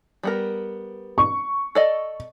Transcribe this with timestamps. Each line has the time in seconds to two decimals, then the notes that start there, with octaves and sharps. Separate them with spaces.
0.23 G3 B3 A#4
1.18 C#6
1.75 A4 D5 D#5